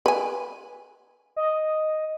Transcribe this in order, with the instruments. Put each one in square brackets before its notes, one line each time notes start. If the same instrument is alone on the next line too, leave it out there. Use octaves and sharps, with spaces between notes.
[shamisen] B4 G#5
[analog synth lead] D#5